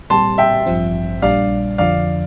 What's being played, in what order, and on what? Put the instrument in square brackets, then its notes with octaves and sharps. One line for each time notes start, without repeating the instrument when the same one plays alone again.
[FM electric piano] A#2 G3 C4 G4 [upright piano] A5 C6
[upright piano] E5 G5
[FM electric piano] A1 G2 F3 C4
[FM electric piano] A#1 A#2 G3 D4 [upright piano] D5 F5
[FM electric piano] F2 D3 F3 [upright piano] D5 F5